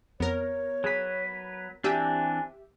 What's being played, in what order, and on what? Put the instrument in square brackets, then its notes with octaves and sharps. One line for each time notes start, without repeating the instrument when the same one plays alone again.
[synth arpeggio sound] F2 [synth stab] B3 A#4 [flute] C#5
[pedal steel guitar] F#3 B4 [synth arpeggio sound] G#4 B6
[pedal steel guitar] E3 C4 D4 [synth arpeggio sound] F#4 D#7 [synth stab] G4 E5 [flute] G#5